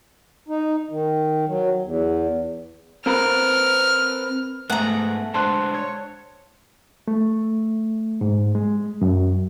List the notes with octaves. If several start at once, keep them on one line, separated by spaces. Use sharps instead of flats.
D#4
D#3
F#3
E2
C4 A#4 B4 F6
G#2 A3 B3 G#4 F#5 A#5
G#3 D4 C5 A5 C6 F#6
C#5
A3
G#2
G#3
F#2